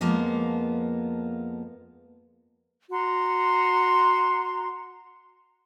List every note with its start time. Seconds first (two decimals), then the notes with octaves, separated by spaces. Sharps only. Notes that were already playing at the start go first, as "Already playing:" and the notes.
0.01 F2 F3 G#3 A#3 B3
2.90 F#4 A#5 C6